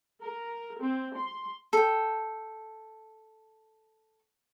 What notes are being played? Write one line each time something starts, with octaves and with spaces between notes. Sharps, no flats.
A#4
C4
C6
A4 G5